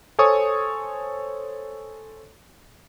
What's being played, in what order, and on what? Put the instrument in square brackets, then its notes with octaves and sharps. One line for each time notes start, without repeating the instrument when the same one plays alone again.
[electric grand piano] A4 C5 C#5 G#5 C#6 D#6